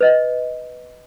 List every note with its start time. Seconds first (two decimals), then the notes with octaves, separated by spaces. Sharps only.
0.01 B4 D#5